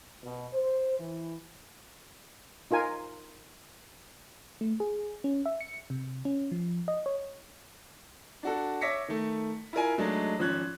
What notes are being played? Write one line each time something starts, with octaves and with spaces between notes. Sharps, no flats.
B2
C5
E3
D#4 F4 A#4 G#5
A3
G#4
C#4
E5
C#7
C3
C#4
F3
D#5
C#5
D4 F#4 A4
C#5 E5 D6 A#6 B6 C#7
D#3 A3
E4 F4 A#4 G#5
F#3 G#3 A3 D4 D#4
G#1 F3 C#4 F#6 G#6 F#7